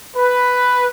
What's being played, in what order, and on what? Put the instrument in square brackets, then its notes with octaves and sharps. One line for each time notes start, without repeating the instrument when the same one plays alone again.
[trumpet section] B4